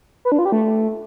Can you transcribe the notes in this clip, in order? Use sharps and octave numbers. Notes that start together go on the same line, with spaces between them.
B4
D4
F4
G4
A3